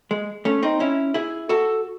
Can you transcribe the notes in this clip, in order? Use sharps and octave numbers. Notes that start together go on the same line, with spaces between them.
G#3
A3 C#4
C4 D#4
C#4 E4
E4 G#4
F#4 A4